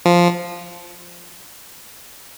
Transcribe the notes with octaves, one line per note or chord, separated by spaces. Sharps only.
F3